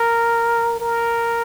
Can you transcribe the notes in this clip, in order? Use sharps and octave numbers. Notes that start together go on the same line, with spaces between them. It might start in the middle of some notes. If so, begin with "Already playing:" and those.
Already playing: A#4
A#4